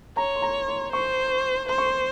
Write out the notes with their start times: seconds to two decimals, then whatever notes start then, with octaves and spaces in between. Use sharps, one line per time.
0.17 C#5 A#5
0.36 C6
0.42 A#5
0.68 C6
0.93 C5 C#6
1.69 C5 C6
1.78 C#6
1.87 C6